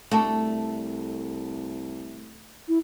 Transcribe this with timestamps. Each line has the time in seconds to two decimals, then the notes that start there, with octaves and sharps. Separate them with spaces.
0.11 C2 A3 D4 F#4 A4
2.68 E4